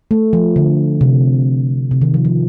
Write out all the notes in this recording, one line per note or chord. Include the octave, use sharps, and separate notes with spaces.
A3
F3
D3
C3
C3
D#3
F3
F3